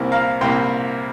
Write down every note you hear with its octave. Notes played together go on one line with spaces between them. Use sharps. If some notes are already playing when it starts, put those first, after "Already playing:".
Already playing: C2 C3 A#3
F5 A#5
C2 C3 A#3 G5 C6